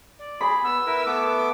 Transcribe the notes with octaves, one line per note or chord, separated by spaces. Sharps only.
D5
G#4 B5
B3 E6
E4 A#4 B4
A3 B3 D6